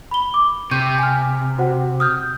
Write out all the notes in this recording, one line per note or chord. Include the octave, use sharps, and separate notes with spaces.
B5 G7
D6
C3 C#6 G6 D#7
G#5 F6
F#4 C5 F#5
D#6 F6 G6